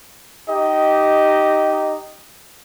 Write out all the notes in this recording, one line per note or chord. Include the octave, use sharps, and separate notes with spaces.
D#4 G4 D#5